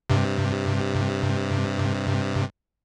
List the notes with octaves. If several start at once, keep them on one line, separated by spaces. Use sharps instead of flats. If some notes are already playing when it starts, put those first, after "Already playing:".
G2 C3